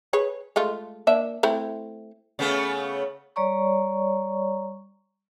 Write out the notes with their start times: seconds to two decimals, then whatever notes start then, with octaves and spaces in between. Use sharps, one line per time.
0.13 G#4 B4 C#5
0.56 G#3 A3 F4
1.07 A#3 D4 E5
1.43 A3 C4 E4
2.39 C#3 A3 B3
3.36 G3 C#5 D5 A#5 C#6